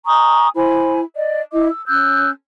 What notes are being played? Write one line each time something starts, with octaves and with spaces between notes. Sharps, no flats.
G#5 A#5 C#6 D#6
E4 C5 G#5 B5
D5 D#5
E4 D#5 D6
E6
C#4 E6 F#6 G6